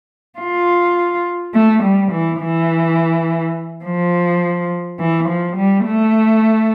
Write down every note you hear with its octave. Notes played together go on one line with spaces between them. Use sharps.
F4
A3
G3
E3
E3
F3
E3
F3
G3
A3